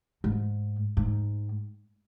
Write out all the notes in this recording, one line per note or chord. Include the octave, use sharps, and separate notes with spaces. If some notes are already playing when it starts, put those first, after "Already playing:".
G#2
G#2